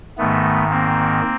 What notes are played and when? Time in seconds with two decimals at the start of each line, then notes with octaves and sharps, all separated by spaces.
0.18 G#2 D#3 A3 B3
0.70 A#3 C4